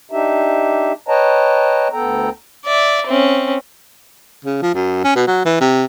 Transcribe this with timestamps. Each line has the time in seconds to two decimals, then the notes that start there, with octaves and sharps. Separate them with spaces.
0.11 D4 D#4 G4 E5
1.08 B4 C#5 D#5 G5 A5 A#5
1.93 D2 B3 A4 G5 A#5
2.65 D5 E5
3.07 C4 C#4
4.45 C#3
4.62 F3
4.75 F#2
5.04 C#4
5.16 B2
5.27 F#3
5.45 E3
5.61 C3